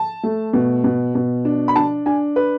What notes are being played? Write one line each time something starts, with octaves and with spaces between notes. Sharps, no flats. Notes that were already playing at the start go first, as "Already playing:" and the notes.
Already playing: A5
A3
B2
B2
B2
D4
B5
D4 A5
D4 G#5
B4